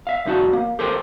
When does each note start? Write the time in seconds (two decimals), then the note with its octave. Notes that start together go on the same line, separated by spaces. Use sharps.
0.07 E5 F5
0.25 C2 F2 D#4 F#4 A5
0.53 A#3
0.79 G4 A4 A#4 C5 G5 G#5